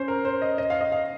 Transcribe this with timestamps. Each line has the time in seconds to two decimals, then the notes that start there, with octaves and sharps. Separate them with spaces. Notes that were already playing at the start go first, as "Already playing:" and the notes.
Already playing: C#4 C5 C#5
0.08 A#4
0.25 C5
0.42 D#5
0.58 D#5
0.70 F5
0.81 D#5
0.92 F5